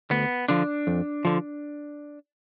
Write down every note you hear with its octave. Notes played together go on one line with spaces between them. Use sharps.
D2 B3
D3 F3 D4
F2
D3 F3